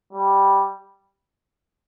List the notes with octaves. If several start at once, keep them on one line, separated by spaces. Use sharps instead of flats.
G3